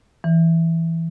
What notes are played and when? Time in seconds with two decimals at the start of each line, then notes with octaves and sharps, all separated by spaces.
0.24 E3